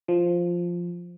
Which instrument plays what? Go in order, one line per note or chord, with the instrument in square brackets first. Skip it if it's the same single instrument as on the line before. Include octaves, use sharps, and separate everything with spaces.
[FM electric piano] F3